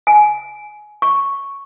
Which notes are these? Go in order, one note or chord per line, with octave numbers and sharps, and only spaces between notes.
G#5
C#6